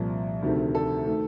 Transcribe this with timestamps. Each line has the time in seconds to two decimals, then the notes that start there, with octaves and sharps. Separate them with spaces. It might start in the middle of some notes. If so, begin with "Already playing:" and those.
Already playing: C2 A#2 F3
0.42 D2 C3 D#3 A3
0.75 A4
1.06 D#3 A3